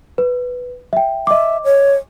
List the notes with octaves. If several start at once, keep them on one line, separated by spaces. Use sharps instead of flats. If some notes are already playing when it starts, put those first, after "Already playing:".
B4
E5 G5
D#5 E5 D6
C#5